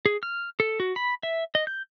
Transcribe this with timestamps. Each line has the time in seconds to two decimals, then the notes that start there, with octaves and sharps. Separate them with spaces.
0.06 G#4
0.23 F6
0.60 A4
0.80 F#4
0.96 B5
1.23 E5
1.55 D#5
1.67 G6